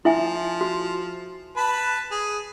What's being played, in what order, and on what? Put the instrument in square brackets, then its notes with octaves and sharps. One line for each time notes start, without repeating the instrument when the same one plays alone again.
[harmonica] F3 [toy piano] E4 E5 G#5
[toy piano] F#4
[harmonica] B4 A5 B5
G#4